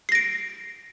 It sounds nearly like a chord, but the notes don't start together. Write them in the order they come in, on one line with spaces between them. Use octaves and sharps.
C7 A#6 D7